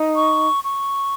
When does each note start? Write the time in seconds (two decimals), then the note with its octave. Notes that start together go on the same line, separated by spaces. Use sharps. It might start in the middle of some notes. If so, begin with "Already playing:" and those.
Already playing: D#4
0.16 C#6
0.63 C#6